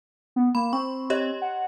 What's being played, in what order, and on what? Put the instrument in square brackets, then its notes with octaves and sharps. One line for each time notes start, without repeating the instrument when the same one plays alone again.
[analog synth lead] B3
[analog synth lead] A#3 [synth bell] B5
[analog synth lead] C4 [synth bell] C#6
[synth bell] G4 C#5 D#5
[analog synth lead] F#5